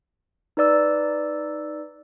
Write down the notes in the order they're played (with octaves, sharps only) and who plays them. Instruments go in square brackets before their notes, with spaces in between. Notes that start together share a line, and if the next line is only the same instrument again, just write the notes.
[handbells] D#4 B4 D5 E6